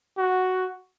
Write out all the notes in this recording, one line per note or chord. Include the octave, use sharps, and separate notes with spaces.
F#4